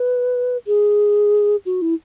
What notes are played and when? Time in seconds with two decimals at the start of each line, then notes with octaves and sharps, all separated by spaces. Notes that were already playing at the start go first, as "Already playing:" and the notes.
Already playing: B4
0.67 G#4
1.66 F#4
1.82 E4